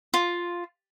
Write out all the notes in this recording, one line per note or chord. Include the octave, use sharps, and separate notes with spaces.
F4